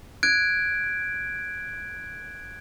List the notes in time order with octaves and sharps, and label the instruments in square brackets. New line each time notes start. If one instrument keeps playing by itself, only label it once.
[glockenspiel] F#6 G#6 D7